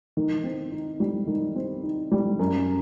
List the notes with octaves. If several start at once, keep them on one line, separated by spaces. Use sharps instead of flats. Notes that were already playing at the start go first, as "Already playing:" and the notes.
D#3
C4
D#4
G3
D#3
C4
D#4
G3
F#2